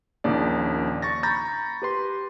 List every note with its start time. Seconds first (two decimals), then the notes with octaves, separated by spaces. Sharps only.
0.24 A#1 D#2 C#3 D5
1.02 C#6 A6 A#6
1.23 A#5 B5 C#6 G6 A6 A#6
1.82 G4 B4 C6